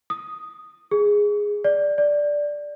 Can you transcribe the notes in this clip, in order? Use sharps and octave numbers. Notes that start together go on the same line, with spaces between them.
D#6
G#4
D5
D5